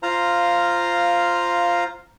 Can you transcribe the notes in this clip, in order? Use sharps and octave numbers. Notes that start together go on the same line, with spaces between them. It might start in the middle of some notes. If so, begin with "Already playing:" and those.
F4 C5 F5 A#5